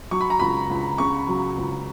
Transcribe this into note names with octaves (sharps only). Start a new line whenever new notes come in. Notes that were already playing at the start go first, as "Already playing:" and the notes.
F#3 C#6
B5
A#5
C#2 B5
C#2
C#3 C#6
F#3
C#2